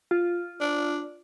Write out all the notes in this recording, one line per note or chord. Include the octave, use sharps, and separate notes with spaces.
F4
D4